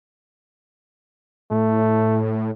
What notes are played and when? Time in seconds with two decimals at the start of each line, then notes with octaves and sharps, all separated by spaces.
1.51 A2 A3